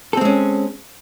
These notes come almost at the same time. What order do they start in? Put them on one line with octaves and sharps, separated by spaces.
A4 C4 G#3 C#4